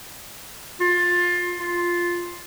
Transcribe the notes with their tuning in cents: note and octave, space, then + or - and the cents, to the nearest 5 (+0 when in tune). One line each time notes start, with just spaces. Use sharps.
F4 +20
F4 +0